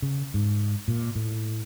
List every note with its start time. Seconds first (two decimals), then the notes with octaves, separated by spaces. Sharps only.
0.02 C#3
0.34 G#2
0.88 A#2
1.16 A2